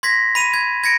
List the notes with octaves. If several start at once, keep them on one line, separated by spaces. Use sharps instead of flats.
C6 G#6 A#6 B6
B5 D#7 F7
G#6
G#6 A#6 C#7 D7